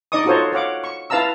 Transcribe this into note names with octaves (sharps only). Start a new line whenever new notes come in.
D#4 D5 D#5 C#6 D#6
D#4 F4 F#4 A4 C5 C#5
C#5 F5 F#5 D6
C#6
E4 B4 F5 A5 A#5 E6